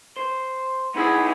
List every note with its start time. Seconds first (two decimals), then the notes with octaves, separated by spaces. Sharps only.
0.17 C5
0.94 B3 D#4 E4 G#4 F#5